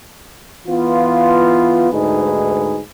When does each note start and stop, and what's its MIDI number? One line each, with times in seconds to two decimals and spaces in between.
0.67 1.89 52
0.67 1.89 59
0.67 1.89 65
1.91 2.80 38
1.91 2.80 44
1.91 2.80 63
1.91 2.80 68
1.91 2.80 71